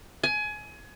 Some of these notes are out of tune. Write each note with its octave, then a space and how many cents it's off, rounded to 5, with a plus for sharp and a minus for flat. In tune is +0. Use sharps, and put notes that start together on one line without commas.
G#5 +25